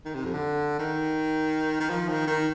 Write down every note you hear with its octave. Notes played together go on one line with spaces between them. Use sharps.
D#3
C3
F2
D3
D#3
D#3
F3
D#3
D#3